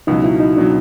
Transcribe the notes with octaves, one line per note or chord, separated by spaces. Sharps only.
C#2 B2 F#3 D#4
E4
D#4
B2 F#3 D4